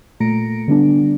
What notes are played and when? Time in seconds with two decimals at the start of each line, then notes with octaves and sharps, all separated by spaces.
0.20 A#2 A3 A#5 A#6 C#7 D7
0.68 D3 G3 B3 D4